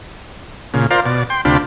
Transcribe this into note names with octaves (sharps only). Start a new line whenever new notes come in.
A#2 C#3
F4 A#4 C5 D5 F5
B2 D5
G5 C6
D2 C3 D4 F4 G4 B5